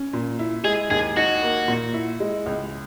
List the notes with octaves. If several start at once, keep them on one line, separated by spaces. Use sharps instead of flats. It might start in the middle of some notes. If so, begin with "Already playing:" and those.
Already playing: C#4
A#2
E4
G#3 G#4
D#2 G#4
D#4 F#4
A#3
A#2
E4
G#3
C#2